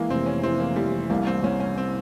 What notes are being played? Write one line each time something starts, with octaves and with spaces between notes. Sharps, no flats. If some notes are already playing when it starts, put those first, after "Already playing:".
Already playing: E3 G#3 A#3
F1 C4
C#4
E3 C4
A#3
E3 G3
C2 A#3
C4
C2 C#4
C#4
C4